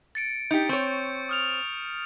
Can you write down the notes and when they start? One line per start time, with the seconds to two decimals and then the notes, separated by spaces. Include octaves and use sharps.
0.15 A6 C#7 D7
0.51 D#4 G4 G6 C#7
0.69 C4 C#5 C#6
1.29 D#6 F6 F7